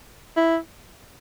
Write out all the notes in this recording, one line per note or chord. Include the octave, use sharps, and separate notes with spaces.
E4